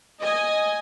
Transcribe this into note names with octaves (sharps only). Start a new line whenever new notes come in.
D#5 G#5